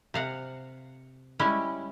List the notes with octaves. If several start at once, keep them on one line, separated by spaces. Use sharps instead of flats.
C3 F5 F#5
G3 G#3 C#4 E4